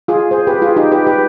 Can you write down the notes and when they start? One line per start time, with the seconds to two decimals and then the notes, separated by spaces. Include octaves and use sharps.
0.08 F4 G#4
0.31 G#4 C5
0.47 G4 B4
0.62 F4 G#4
0.76 D#4 G4
0.92 G4 B4
1.07 G4 B4